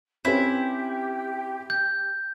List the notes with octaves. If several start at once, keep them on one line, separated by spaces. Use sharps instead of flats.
C4 C#4 E4 G4 B4
G6